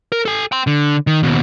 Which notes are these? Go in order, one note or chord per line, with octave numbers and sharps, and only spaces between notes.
A#4
A4 G#5
G5 C6
D3
D#3
D#2 B2